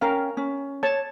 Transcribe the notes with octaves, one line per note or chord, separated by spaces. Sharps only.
C#4 A#4 F5 G5
C#4
C#5 A5